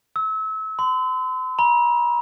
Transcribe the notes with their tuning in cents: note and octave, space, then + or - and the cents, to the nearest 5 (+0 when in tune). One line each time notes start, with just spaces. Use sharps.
E6 -30
C6 -40
A#5 +45